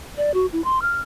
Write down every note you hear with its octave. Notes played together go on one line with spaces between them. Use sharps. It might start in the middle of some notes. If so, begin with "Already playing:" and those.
D5
F#4
E4
C6
F6